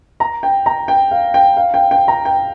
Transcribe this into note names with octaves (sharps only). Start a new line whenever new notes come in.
A#5
G5
A#5
G5
F5
G5
F5
G5
G5
A#5
G5